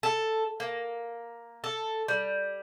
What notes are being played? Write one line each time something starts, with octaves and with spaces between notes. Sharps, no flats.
A4
A#3
A4
G3